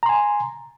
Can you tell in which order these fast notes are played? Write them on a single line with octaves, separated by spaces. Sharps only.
A#5 C6 G#5